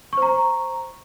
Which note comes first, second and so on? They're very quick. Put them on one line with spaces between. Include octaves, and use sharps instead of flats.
C#6 C5 A#5